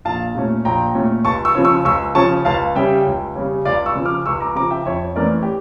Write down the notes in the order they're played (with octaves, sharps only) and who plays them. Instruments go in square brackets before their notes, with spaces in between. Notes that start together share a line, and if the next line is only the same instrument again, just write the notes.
[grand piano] A#1 F5 A5
A#2 A3 C#4
A#1 G5 A#5
A#2 A3 C#4
C#2 A5 C#6
C#6 E6
C#3 F3 C#4
C#6 E6
C#2 C#6 E6
C#3 F3 C#4 A5 C#6
C#2 F5 A5
C#3 G3 C#4 E5 G5
C#2
C#3 G3 C#4
C#2 D5 F5
C#6 E6
C#3 F3
D6 F6
C#2 C#6 E6
A#5 D6
C#3 A#5 D6
F3
E5 G5
F2 C#5 E5
E3 A3 C#4 A#4 D5
G4